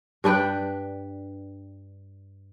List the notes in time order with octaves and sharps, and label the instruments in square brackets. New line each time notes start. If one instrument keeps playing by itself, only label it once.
[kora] G2 D4 B4 G5